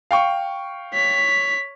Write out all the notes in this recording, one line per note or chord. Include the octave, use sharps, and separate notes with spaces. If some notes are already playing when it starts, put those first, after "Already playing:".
F5 G5 C#6
C#5 B6